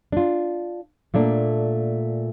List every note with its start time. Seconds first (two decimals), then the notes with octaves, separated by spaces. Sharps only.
0.12 D4 F4
1.14 A#2 A3 A#3 D4